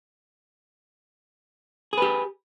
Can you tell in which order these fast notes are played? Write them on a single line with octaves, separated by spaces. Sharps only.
G#4 B4 G4